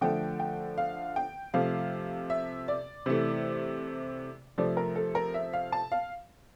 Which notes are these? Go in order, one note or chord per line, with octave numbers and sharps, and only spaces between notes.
D3 F3 A3 G5
G5
F5
G5
C3 F3 A3 F5
E5
D5
C3 E3 A3
C3 F3 A3 D5
A#4
A4
A#4
E5
F5
A5
F5